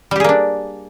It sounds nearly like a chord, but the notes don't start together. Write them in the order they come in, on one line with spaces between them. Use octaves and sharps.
G3 G4 G#4 A#3 D4